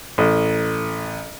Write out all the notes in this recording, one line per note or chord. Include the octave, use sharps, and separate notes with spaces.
A1